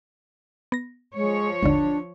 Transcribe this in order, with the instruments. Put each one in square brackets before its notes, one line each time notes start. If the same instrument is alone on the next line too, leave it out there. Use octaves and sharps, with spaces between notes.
[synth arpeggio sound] B3 A#6
[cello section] F3 C#5 [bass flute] G#3
[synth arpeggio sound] G#1 D#2 D3 [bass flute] D4